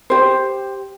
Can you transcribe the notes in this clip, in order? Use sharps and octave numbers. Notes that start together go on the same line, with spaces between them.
G4 C5